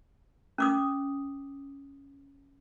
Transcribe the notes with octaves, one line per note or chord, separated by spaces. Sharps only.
C#4 D6 D#6